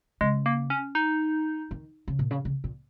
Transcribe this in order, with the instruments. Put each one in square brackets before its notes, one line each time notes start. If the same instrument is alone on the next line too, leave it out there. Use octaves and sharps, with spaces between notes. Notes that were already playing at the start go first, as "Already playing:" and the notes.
[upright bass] C#3 [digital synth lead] G#3
[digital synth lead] A#3
C#4
D#4
[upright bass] D#3
C#3
A#2
C#3
C#3
A#2